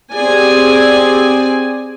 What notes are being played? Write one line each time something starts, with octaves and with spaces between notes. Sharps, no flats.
C4 G4 G#4 D5 G#5